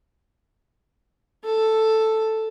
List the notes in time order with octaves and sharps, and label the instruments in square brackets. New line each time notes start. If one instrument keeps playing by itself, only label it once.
[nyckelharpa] A4